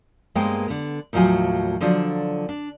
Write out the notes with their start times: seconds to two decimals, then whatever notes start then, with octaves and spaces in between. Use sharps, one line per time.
0.35 G2 G#3 A#3 B3 C5 G5
0.68 D3 B3
1.13 D#2 A2 F3 F#3 F4 G#5
1.81 D3 F3 F#3 D4 F4 A4
2.49 D4